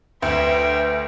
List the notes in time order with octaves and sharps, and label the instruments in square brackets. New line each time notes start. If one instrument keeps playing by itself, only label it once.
[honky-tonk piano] D2 [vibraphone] B4 [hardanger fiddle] E5 F5 [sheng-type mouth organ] G5